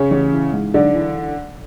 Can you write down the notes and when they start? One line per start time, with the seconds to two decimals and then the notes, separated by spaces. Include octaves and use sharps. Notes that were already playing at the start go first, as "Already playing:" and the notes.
Already playing: C#3 C#4
0.11 A1
0.32 E3
0.53 G#2
0.74 B1 D3 D4
0.95 E3